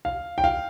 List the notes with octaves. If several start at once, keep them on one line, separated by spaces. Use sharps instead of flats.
F5
G5
F5